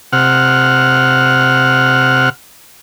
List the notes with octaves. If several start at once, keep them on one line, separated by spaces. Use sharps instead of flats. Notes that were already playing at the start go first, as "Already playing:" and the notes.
C3 F#5 F6